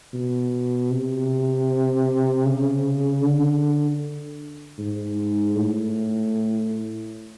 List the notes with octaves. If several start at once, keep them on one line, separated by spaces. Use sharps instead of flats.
B2
C3
C#3
D3
G#2
A2